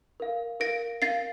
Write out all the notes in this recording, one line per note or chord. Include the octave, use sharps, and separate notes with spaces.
A#4 F5
A#4 F5 A#6 D7
A#4 F5 A6 C7